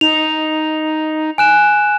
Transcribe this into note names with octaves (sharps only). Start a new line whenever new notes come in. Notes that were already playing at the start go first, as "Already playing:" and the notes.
D#4 F7
G#5 F#6 E7